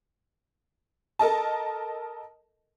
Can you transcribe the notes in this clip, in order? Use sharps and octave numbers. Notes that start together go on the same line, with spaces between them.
A4 A#4 D#5 A5